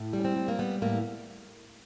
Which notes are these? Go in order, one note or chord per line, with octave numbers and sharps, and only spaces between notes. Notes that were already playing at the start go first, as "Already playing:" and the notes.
Already playing: A2
G3
C#4
C4
G3
A#3
G3 B3
A2 A#3